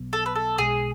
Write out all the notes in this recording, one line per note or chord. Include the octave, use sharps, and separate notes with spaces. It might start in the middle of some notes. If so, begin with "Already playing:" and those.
Already playing: B1 B2 F#3 B3
A4
B4
A4
B1 B2 G#3 G#4